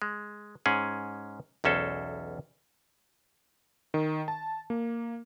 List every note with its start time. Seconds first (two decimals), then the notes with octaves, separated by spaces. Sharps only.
0.02 G#3
0.66 G#2 C#4 G#4
1.64 B1 E2 C#4 A4 C5
3.94 D#3
4.28 A5
4.70 A#3